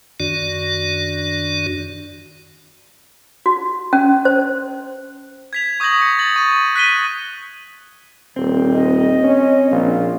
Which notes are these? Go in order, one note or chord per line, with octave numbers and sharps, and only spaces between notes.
F#2 D#3 D4 F#4 D5
F#4
C#4
C5
G#6 B6 F7
C#6 D#6 G6 G#6 A#6 F#7
C#7
A6 F#7
C#6 D#7
F#6 B6 D#7 G7
D#1 C4
D#5
C#4
A#1 F4